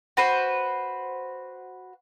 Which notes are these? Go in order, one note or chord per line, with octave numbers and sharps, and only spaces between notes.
F#4 B4 C5